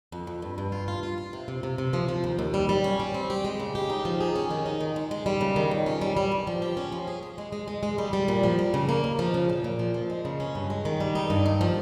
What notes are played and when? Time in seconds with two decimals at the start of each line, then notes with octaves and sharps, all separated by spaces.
0.12 F2
0.27 F2
0.42 G2
0.58 G2
0.72 F4
0.88 F4
1.03 F4
1.18 F4
1.33 C3
1.48 C3
1.63 C3
1.78 C3
1.93 F3
2.08 F3
2.24 D#2
2.39 D#2
2.54 G3
2.69 G3
2.84 C#4
3.00 G3
3.14 C4
3.30 G4
3.45 G#3
3.60 C#3
3.75 G4
3.90 D#4
4.05 F3
4.20 G#4
4.36 C#4
4.51 D#3
4.66 D#4
4.81 D#3
4.96 G#3
5.11 G#3
5.26 G3
5.41 C#3
5.56 D#3
5.71 F2
5.86 C#4
6.01 G3
6.17 G3
6.32 G2
6.47 F3
6.62 G4
6.77 C#4
6.92 F3
7.07 G#4
7.23 G#4
7.38 G#3
7.53 G#3
7.68 G#3
7.83 G#3
7.98 G3
8.13 G3
8.28 A#2
8.43 F3
8.59 G3
8.74 C#3
8.89 A#3
9.04 D#2
9.19 F3
9.34 C#3
9.49 A#2
9.64 A#2
9.79 F3
9.94 F3
10.10 G#3
10.25 C#3
10.40 C#4
10.55 G2
10.70 G#3
10.85 D#3
11.00 G3
11.15 D#4
11.30 G2
11.46 D#3
11.61 F3